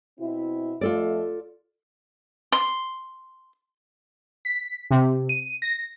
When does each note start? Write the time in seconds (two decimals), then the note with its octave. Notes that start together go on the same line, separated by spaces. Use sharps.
0.19 B2 C4 E4
0.81 F2 A3 F4 A4 D5
2.52 C6
4.45 B6
4.90 C3
5.29 D#7
5.62 A#6